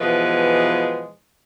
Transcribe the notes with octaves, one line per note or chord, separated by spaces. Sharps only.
B2 E3 F3 G#3 B4